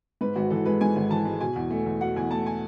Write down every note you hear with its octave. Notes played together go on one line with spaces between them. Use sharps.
G#2 B4
G#1 F#4
E3 A4
G#3 B4
G#2 G#5
G#1
E3 A5
G#3
B2 G#5
E2
A3
E2
B2 F#5
E2 G#5
A3 A5
G#5